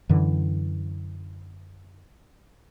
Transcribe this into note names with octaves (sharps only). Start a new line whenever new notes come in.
F#2 D3 E3